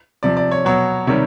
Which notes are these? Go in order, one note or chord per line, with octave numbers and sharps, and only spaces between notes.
C3 F3 D5
D5
C#5
B2 F#3 C#5
C3 D#3 G3 C#5